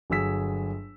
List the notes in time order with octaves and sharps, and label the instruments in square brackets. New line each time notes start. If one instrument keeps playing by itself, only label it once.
[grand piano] G1 F#3 G#4 E6 B6